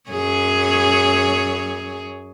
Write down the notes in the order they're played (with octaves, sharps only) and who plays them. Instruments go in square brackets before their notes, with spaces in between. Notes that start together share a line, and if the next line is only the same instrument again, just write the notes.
[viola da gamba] F#2 G#4 C#5